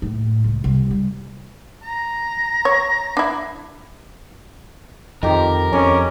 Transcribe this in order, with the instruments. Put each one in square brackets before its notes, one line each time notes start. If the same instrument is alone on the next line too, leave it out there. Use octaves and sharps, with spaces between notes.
[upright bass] A2
C#2
C2
G3
[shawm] A#5
[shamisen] C#5
D4 E4
[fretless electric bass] F2 F3 [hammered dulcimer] D#3 G4 [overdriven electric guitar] A#4
[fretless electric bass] F2 [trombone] C#4 [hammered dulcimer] D6